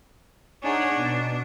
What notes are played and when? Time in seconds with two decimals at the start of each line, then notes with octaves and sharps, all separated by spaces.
0.64 D4 D#4 G#4 C#5 F#5 G#5
0.95 B2